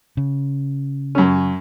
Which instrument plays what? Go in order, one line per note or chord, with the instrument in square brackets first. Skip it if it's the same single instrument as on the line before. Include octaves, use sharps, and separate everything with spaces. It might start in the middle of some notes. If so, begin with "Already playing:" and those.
[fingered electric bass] C#3
[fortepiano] F#2 C#4